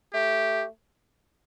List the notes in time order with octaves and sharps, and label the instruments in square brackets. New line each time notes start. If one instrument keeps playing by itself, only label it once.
[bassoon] A3 [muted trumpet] G4